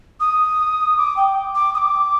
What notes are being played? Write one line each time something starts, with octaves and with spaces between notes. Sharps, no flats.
D#6
D6
G5
D6
D#6
D6